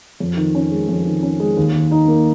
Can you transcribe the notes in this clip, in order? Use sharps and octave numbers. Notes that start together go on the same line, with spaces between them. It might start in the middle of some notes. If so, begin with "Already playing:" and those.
F2
D#3
C#4
G#3
F2
D#3
C#4
G#3
D#2
D#3
D#4
A#3